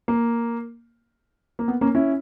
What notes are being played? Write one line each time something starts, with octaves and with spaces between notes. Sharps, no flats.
A#3
A#3
B3
A#3 C#4
C#4 E4